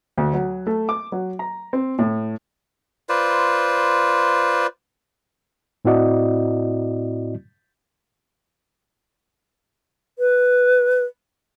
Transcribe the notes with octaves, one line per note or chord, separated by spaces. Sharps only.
D2
F#3
A3
D6
F#3
A#5
C4
A2
F4 B4 C5 D5
A2 C4 E4 F#4 D5 D#5
B4